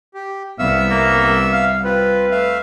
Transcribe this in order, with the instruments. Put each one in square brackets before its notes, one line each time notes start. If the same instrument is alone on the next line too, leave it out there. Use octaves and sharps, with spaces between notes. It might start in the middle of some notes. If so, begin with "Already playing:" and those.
[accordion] G4
[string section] C2 [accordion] B3 E5 E6 [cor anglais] F5
[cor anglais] A#3
F5
[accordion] C4 F4 [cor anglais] B4
[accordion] A3 E5 F5